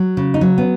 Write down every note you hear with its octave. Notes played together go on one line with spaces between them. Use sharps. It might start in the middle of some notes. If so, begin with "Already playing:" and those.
Already playing: F#3
C#3
D#4
F#3 C#4
B3